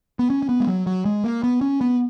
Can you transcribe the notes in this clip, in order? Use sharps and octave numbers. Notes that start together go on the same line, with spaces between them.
B3
C#4
C#4
B3
G#3
F#3
F#3
G#3
A#3
B3
C#4
B3